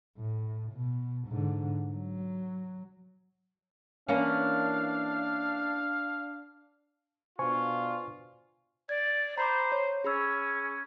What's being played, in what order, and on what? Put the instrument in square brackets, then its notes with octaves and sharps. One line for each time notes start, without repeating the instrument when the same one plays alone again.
[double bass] A2
B2
G#2 D3
F#3
[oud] E3 A#3 C#4 [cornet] D4 [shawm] F5
[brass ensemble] B2 D4 F4 [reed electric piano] C5 G#5 C#6
[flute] D5 [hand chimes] G#6
[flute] C5 [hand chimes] A#5 B5 D6
[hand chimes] C#5
[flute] C#4 [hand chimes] G#4 B5 E6